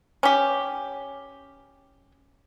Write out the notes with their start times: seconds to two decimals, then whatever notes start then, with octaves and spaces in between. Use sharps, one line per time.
0.23 C#4 G4